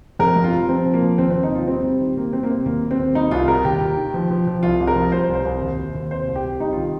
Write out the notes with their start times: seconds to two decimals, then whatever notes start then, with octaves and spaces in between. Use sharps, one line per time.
0.19 F2 A#4
0.36 F2
0.44 F4
0.52 G3
0.69 F3 C4
0.85 F3
0.94 A#3
1.02 F3
1.18 D#2 C4
1.31 D#2 C4
1.43 D#4
1.51 D#2 F4
1.67 G3 C4
1.84 G3
2.00 D#3
2.16 D#3 A#3
2.33 G3 C4
2.43 A#3
2.50 C3 C4
2.65 D#2 A#3
2.82 G3
2.91 C4
2.99 D#2
3.15 G3 D#4
3.31 C2 F4
3.48 G3 A#4
3.65 D#2 G4
3.81 D#2
3.97 D#3
4.14 F3
4.31 F3
4.47 F3
4.63 C2 F4
4.80 C2
4.87 A#4
4.96 F3
5.12 G3 C5
5.29 C2
5.35 C5
5.45 C2
5.62 D#2
5.78 D#2
5.94 D#2
6.11 C3 C5
6.28 C2
6.36 G4
6.44 C2
6.60 G3 D#4
6.72 D#3 F4